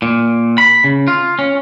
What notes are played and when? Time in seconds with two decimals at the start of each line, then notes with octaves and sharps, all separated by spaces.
0.02 A#2
0.58 B5
0.84 C#3
1.08 F4
1.39 C#4